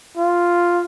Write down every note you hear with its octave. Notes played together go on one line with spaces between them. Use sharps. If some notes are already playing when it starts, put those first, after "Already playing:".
F4